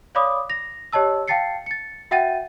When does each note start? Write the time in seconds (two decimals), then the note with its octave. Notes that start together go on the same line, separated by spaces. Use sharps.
0.15 C#5 D5 F5 B5 D6 D#6
0.50 A#6 F7
0.93 G4 C#5 D#5 A5 E6
1.28 F5 G5 A5 A6 C7 C#7
1.66 A6 C#7
2.11 F#4 E5 F#5 G5 A6 D#7